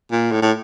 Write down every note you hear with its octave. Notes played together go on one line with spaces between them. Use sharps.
A#2
A2
A2